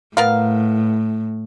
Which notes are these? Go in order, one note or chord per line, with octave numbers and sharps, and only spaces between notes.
A2 B3 A#4 F5